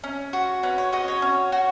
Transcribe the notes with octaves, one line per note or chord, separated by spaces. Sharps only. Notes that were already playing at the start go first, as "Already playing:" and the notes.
C#4
F#4
C#4 B4
C#5
F#4 D#5
C#5
C#4
F#4